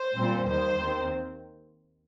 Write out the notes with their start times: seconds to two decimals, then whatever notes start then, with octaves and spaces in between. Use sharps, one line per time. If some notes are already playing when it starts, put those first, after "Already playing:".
Already playing: C5
0.15 A#2 G3 C4
0.45 D#2 D#3 G3 C5
0.75 D#2 D#3 C4